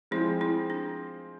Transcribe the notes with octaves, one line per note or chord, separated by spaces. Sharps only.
F3 G#3 C4 E4
E4
D4